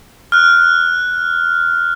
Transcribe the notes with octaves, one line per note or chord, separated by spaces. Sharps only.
F6 F#6